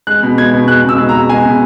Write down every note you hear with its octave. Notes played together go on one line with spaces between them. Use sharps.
G#3 F#6
B2
G#3 G#6
B2
G#3 F#6
B2 E6
G#3
A#5
B2
G#3 G#5
B2